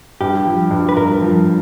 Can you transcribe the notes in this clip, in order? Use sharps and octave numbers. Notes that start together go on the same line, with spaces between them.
G2 G4
F3
G2
B4
G2 A#4
F3